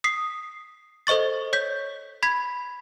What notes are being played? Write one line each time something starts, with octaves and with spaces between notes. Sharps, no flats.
D#6 B6 C7
A4 C5 D#5 C#6 A6
C#5 G6 B6
B5 G#6 B6